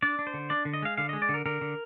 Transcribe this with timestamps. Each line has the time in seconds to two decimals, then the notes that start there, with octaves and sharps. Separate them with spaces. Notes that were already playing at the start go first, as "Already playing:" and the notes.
0.02 D4 D5
0.19 D4
0.27 C5
0.34 D3
0.50 D4 D5
0.65 D3
0.74 D#5
0.82 G#3 F5
0.97 D3 F5
1.09 G#3 D#5
1.22 D5
1.29 D3
1.34 A#4
1.46 D3 A#4
1.61 D3